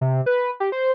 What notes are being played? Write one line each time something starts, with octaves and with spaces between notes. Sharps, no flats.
C3
B4
G4
C5